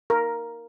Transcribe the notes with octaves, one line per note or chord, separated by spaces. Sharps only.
A#4